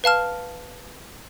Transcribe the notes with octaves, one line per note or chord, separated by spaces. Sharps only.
B4 F5 A5 F6